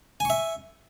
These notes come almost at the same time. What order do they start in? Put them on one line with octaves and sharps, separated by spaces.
G#5 C#6 E5